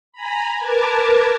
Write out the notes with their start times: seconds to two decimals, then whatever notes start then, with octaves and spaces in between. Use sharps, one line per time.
0.12 G#5 A#5 B5
0.60 A#4 B4 A5 D6 G#6